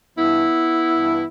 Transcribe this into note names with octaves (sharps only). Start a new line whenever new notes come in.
G2 E3 B3 E4
G2 E3